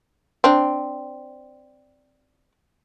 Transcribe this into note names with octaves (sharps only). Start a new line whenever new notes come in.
C4 D4